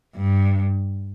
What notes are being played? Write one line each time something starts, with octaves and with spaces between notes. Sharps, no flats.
G2